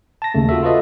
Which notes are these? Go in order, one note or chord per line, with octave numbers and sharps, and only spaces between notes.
A5 A#6
D#2 C#3 A3
F4 F#4 A4 E5
F4 F#4 A4 B4 D#5 E5